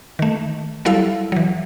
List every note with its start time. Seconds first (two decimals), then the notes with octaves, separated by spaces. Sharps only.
0.19 D#3 A3
0.85 F#3 G3 E4 A4 F5
1.32 E3 F#3